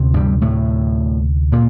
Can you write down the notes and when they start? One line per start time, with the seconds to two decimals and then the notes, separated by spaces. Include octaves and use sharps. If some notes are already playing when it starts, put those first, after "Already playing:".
Already playing: D2 C3
0.14 G2 G3
0.41 A2 A3
1.52 A#2 A#3